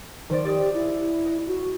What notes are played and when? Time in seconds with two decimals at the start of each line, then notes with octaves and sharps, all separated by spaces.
0.30 D#3 C5 D5
0.45 G4 D5 D#5 D#6
0.74 E4
1.26 D#5
1.47 F#4